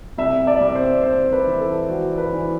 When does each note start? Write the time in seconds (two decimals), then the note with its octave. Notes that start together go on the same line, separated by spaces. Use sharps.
0.18 C2 E5
0.47 D5
0.61 C2
0.75 C5
1.03 C2 C5
1.33 B4
1.47 E3
1.61 A4
1.89 E3 F#4
2.18 B4
2.33 E3